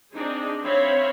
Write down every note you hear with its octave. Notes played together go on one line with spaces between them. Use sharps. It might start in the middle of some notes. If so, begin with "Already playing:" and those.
C4 D4 D#4 G#4
C4 C5 C#5 E5 F5 B5